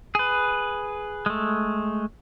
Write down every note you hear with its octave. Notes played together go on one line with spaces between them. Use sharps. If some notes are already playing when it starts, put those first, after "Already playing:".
G#4 B4
G#3 A3